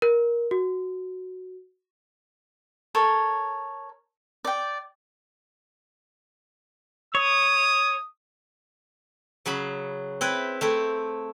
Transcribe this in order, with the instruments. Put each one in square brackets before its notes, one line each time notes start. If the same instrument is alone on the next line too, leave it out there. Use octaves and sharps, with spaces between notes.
[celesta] A#4
F#4
[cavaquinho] A4 A#4 C#5
D5 G5
[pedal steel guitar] C#5 [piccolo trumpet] D#6
[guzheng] C#3 F#3 G#4 B5
C4 E4 B4
A3 C4 E4